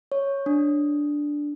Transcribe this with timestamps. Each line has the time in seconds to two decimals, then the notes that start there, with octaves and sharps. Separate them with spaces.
0.12 C#5
0.46 D4